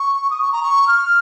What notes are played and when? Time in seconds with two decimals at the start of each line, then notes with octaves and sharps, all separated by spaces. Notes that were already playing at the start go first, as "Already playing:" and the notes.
Already playing: C#6
0.30 D#6
0.42 C#6
0.52 A#5
0.63 C#6
0.88 F6